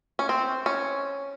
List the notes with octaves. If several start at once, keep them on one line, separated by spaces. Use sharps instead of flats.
C#4
C4
C#4